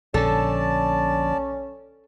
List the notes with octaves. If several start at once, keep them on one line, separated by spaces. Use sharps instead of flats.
A#1 D3 C#4 A4 D5 A5